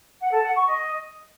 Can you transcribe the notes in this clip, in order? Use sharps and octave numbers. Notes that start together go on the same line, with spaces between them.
F#5
A4
F#5
C#6
D#5